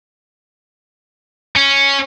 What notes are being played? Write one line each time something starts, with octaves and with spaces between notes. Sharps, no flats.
C#4